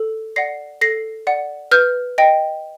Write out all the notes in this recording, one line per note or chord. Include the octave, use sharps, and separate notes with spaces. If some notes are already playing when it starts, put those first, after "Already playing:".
Already playing: A4
D5 F#5 A#6 C7
A4 A#6 C7
D5 F#5
B4 F6 G6
D#5 G5